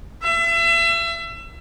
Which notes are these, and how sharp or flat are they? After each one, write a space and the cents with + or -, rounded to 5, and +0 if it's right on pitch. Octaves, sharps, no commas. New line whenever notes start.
E5 +35